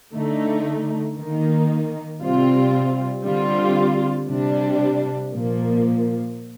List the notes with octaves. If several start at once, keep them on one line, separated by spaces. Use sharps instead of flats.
D3 A3 D#4
D#3 A#3 D#4
C3 G3 C4 F4
D3 G3 C4 F4
C3 G3 D4
A#2 F3 A#3